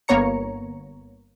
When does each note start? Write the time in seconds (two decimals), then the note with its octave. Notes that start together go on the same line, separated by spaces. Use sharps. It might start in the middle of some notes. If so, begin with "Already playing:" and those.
0.08 G1 A#3 B3 C#5 A#5 C#7